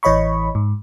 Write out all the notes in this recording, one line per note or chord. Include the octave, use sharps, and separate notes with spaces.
A1 E3 C#5 D#5 B5 C#6
G#2